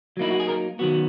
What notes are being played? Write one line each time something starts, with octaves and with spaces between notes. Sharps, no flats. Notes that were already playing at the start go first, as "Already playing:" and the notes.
F#3 A#3 D#4 E4
F#4
G#4
A#4
D#3 F#3 B3 F#4